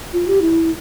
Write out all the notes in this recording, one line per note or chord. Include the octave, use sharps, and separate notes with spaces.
F4
G4
E4